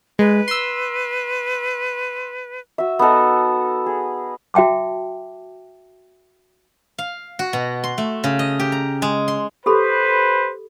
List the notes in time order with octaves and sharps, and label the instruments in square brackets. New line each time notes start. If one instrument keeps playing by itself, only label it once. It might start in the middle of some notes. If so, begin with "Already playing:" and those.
[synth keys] G#3 [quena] B4
[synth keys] C6 E6
[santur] F#4 E5
B3 D#4 A4 D#5
G#4
[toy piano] F#4 E5 G5 A5 D6
[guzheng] F5
F#4
B2
C6
A3
C#3
D#5
G4
A#5
G#3
C6
[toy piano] G4 A4 B5 [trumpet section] B4 C5